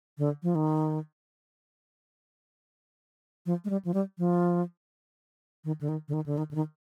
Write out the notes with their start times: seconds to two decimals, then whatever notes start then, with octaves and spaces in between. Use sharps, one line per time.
0.18 D3
0.43 F3
0.55 D#3
3.46 F3
3.65 G#3
3.70 G3
3.85 F3
3.94 G3
4.18 F3
5.65 D#3
5.81 D3
5.89 D#3
6.08 D3
6.13 D#3
6.26 D3
6.38 D#3
6.51 D3
6.55 D#3